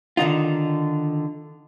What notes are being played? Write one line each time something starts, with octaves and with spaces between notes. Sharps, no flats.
D3 D#3 D#4 F4